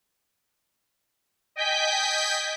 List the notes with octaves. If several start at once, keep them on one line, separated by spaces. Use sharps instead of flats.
D#5 G5 G#5 G6 B6